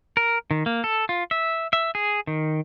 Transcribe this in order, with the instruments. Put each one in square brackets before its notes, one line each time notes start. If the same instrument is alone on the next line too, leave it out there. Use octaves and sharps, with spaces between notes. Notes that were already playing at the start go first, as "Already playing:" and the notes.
[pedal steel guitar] A#4
D#3
A#3
A4
F4
E5
E5
G#4
D#3